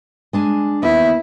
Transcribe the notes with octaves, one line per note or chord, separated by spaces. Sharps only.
G#3 D4 G#5
D#2 B3 E4